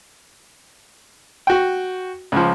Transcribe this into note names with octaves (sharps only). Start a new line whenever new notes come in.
F#4 G5
C#2 F3